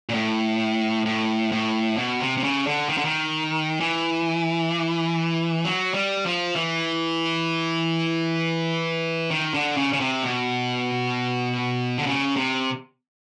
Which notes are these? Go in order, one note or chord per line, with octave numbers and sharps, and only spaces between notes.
A#2
A2
A2
A2
B2
C3
C3
C#3
D3
D#3
D3
D#3
E3
F#3
G3
F3
E3
D#3
D3
C#3
C#3
C3
B2
D3
C#3
C3